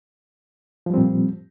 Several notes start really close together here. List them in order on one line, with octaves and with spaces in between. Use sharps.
F3 G3 C4 A#2